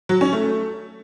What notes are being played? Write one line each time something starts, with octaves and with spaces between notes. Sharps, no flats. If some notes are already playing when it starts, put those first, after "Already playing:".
F#3
C#4
A3